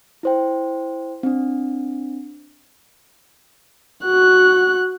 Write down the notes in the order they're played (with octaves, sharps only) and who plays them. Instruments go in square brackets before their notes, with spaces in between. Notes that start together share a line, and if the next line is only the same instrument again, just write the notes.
[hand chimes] E4 C5 G5
C4 D4
[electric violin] F#4 F#6